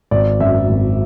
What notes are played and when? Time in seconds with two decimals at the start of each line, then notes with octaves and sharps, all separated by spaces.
0.11 G#1 D5
0.40 F#2 E5
0.69 G#1